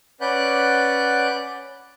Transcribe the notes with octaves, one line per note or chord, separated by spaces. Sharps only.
C#4 B4 D5 F#5 F#6 G6